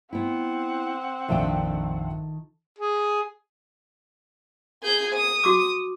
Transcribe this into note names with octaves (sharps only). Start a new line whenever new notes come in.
B3 C4 E4 F#5
A#1 F2 D#3 D4 A4 E5 G5
G#4
G#4 G6
D#6
F#4 C#6 D6